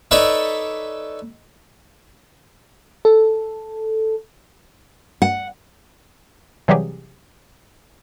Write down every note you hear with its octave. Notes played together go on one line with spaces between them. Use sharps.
D#4 A4 B4 C#5 D5 E5
A4
F#5
C3 E3 F#3 G3 G4 G#4